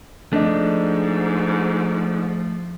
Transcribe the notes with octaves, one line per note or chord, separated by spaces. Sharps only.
G#2 F3 A3 D4 D#5